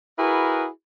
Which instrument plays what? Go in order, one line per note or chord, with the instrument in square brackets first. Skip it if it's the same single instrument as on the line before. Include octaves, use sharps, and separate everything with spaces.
[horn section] E4 F#4 G#4 A#4 B4